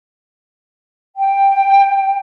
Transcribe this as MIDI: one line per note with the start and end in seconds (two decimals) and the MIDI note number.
1.17 2.18 79